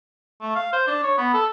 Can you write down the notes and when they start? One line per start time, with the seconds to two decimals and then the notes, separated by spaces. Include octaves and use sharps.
0.41 A3
0.56 F5
0.73 C5
0.87 D4
1.03 C#5
1.18 B3
1.34 A4